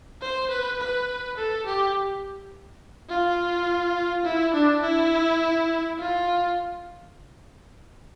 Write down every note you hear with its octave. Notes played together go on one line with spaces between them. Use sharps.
C5
B4
B4
A4
G4
F4
E4
D4
E4
F4